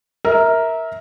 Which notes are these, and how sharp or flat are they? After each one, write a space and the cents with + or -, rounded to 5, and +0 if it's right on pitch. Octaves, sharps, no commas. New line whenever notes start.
A#4 +0 E5 -25